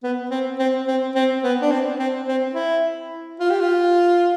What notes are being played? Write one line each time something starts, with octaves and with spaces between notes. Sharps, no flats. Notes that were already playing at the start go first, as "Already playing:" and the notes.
B3
C4
C4
C4
C4
B3
D4
C4
C4
C4
E4
F4
G4
F4